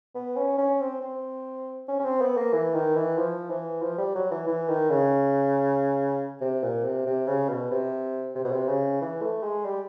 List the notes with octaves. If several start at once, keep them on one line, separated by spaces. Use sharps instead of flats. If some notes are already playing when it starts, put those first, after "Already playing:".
B3
C#4
C#4
C4
C4
C#4
C#4
C4
B3
A#3
E3
D#3
E3
F3
E3
F3
G3
F#3
E3
E3
D#3
C#3
C3
A#2
C3
C3
C#3
B2
C3
C3
B2
C3
C#3
E3
A3
G#3
G3